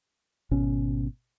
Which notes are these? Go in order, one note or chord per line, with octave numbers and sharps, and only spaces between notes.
G#1 B2 C#4